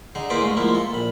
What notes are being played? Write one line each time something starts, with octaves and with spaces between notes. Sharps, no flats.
D3 D#4 G#4
A#3 E4 G#4 B4 C5 D5
D2 G#2 A3
F3 G#3 A#3 E4
A4
A#1 B5